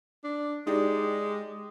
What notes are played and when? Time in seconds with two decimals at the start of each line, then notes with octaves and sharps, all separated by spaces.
0.24 D4
0.67 G#3 D#4 G4 D5